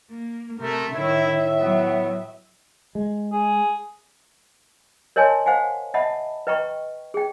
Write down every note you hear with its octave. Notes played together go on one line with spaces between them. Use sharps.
A#3
C3 A3 A#4
A2 D#3 E4 E5
F#3 B3
G#3
G#4
A#4 C#5 D#5 G#5 A5 C6
C5 F5 F#5 G#5
D#5 E5 F#5 A5 B5 D#6
B4 D#5 G5 A#5 C#6
G#4 G5